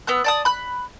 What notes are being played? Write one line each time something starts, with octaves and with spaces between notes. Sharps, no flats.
B3 E6 F#6
D5 A5 D#6
B5 F#6